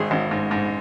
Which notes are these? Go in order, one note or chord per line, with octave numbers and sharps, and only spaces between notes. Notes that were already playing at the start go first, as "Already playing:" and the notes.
Already playing: G#1 G#4
G#1
G#2
G#2